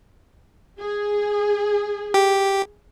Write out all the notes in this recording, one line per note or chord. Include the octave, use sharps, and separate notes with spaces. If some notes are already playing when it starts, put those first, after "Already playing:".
G#4
G4